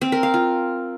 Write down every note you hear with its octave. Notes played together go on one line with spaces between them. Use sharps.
C4
A#4
F5
F4